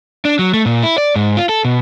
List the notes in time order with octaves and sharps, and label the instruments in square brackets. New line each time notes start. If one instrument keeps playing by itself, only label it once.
[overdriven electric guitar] D4
F#3
A3
A#2
E4
D5
G#2
F4
A4
B2